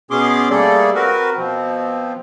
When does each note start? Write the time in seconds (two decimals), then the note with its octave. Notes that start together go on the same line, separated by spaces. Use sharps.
0.11 B2 B3 C#4 G#4 C6 D6
0.50 G3 A3 A#3 G#4 A4 D5
0.95 C4 F#4 A#4 B4
1.37 B2 F3 C4